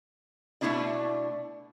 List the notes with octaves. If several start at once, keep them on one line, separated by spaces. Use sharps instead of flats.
B2 A3 C4 D4 E4 D5